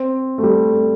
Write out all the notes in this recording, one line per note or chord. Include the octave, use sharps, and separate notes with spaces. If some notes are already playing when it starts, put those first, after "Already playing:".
Already playing: C4
A3
G3
A3